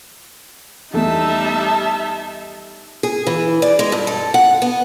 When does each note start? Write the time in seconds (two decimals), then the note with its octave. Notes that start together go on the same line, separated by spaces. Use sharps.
0.94 E2 G3 A3 D#4 E5 A5
3.03 G#4
3.27 E3
3.62 D5
3.79 G#3
3.92 G2
4.07 A4
4.34 F#5
4.62 B3